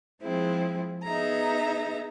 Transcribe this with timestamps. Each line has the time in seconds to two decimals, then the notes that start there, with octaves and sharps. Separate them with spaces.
0.22 F3 G#3 C4 E4
1.04 B3 D#4 G#4 E5 A#5